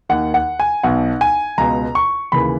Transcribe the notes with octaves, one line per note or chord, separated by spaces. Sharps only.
D#2 D#3 F#5
F#5
G#5
B1 B2 F#5
G#5
C#2 B2 A#5
C#6
D#2 C#3 E3 B5